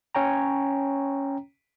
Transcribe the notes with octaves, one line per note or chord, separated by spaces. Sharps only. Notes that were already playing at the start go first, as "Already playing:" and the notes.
C#4 C#5 G5 A#5